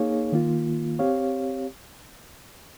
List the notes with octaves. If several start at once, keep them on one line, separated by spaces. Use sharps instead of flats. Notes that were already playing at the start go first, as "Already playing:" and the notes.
Already playing: A#3 D#4 G#4 C#5 F5
D#3 A#3 F4
C4 G4 C#5 F5